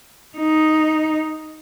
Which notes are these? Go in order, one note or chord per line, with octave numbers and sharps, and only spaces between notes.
D#4